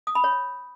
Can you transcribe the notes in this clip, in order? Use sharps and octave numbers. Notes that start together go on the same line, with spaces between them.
D#6
B5
C#5